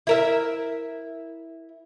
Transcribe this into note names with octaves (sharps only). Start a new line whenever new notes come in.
E4 A#4 E5